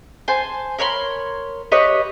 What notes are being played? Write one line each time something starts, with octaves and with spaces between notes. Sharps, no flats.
C5 G#5 A5
A#4 C#5 B5 C6
G4 B4 C#5 D#5